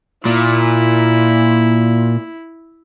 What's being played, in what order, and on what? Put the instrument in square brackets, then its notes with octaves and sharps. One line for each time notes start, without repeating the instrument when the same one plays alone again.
[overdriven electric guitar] A#2 [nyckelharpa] E4